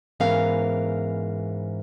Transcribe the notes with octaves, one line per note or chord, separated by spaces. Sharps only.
G#2 E3 B3 C#4 A#4 F5